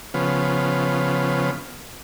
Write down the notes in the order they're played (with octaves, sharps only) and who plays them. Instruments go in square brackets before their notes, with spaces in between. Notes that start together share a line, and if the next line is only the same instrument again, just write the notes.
[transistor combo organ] C#3 F3 B3